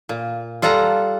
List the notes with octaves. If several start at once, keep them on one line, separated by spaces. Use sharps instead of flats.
A#2
G3 F4 A4 F#5 A#5